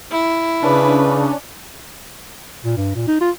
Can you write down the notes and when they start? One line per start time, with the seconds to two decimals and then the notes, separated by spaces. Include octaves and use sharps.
0.11 E4
0.63 C#3 C#4 D4 B4
2.65 A#2
2.77 G2
2.95 A#2
3.08 D#4
3.21 F4